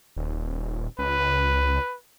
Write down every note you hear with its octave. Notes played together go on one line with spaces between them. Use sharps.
D#1
C#2 B4